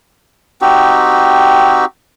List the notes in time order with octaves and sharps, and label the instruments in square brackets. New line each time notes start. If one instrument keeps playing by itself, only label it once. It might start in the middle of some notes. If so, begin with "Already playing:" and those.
[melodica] C4 D#4 F#4 G4